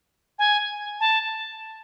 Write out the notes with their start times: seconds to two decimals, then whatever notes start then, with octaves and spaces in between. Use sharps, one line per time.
0.39 G#5
1.00 A5